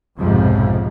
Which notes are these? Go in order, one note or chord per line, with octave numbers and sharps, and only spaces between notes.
B1 F2 G#2 C3 F3